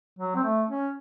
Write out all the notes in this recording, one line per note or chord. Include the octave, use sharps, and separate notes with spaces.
F#3
C4
A3
C#4